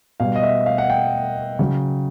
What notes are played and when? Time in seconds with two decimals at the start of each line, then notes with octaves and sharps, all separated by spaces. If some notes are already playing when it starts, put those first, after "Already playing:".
0.20 B2 G3 F5
0.36 D#5
0.43 E5
0.66 F5
0.78 F#5
0.90 G5
1.59 C#3 F#3